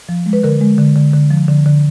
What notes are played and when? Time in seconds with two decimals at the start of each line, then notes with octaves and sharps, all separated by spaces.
0.09 F3
0.26 G#3
0.33 B4
0.43 D3 A#4
0.61 G#3
0.78 D3
0.96 D3
1.14 D3
1.30 F3
1.48 D3
1.66 D3